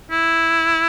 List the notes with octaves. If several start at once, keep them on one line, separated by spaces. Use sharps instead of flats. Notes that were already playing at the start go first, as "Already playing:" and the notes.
E4